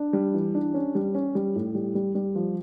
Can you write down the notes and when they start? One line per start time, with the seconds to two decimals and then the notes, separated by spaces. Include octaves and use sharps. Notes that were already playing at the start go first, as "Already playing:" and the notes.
Already playing: D4
0.13 G3
0.34 E3
0.55 D4
0.74 C#4
0.95 G3
1.15 C#4
1.35 G3
1.56 A2
1.75 G3
1.95 G3
2.15 G3
2.35 F3